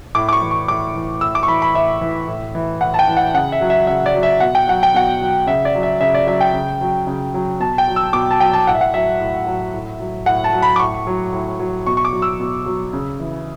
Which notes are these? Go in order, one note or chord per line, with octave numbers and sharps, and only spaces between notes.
A2 D6
D6
C#6
E3
C#6
A2 D6
E3
A2 E6
D6
C#6
E3 B5
B5
A2 E5
E3
A2
E3
A2 F#5
A5
G5
E3
F#5
C#3 F#5
E5
F#3
E5
C#3 E5
D5
F#3
E5
B2 F#5
G5
F#3 F#5
G5
B2 F#5
F#3
C#3 E5
D5
F#3
E5
C#3 E5
D5
F#3 E5
G5
C#3
F#3
C#3
F#3
B2 A5
G5
F#3
E6
B2 D6
A5
F#3 G5
A5
A2 F#5
E5
F#5
F#3 E5
A2
F#3
A2
F#3
A2 F#5
A5
F#3
B5
D6
A2 C#6
F#3
A2
F#3
B2 C#6
C#6
D6
F#3
E6
B2
F#3
C#3
E3